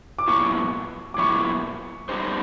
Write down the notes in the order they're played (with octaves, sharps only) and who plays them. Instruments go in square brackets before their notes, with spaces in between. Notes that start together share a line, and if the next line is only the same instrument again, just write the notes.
[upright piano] D6
[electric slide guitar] A#2 F#3 B3 E4 [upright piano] C#6
[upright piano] D6
[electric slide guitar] A#2 F#3 B3 E4 [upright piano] C#6
[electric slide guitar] G3 B3 D#4 G4 C5